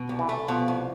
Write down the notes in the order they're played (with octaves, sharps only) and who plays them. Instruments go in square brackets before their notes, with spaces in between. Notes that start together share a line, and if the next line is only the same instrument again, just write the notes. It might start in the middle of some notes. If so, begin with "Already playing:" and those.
Already playing: [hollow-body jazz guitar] B2
C2
[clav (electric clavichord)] E3
[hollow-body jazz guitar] A3
[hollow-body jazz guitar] B2 [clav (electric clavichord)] F3
[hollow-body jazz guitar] C2